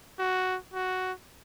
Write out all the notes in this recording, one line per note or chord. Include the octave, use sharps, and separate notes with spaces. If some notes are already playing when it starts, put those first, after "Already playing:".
F#4
F#4